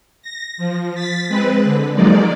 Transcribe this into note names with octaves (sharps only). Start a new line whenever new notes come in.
A#6
F3
A6 B6
G#3 C4 B4
D3
F3 F#3 G#3 A#3 D#4 D5